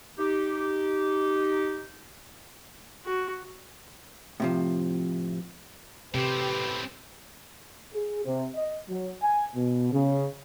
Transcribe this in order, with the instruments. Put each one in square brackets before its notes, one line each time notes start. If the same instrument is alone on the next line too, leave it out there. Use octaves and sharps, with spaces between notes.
[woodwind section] D#4 G4
[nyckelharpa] F#4
[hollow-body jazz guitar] A2 C3 F3
[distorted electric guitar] A2 C4 [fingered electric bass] C3 [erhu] G4 [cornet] B4
[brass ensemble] G#4
C3
D#5
F#3
G#5
B2
C#3